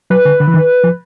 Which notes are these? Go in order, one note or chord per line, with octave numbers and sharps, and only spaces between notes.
F#3 B4
D3
D3
E3
D#3
F3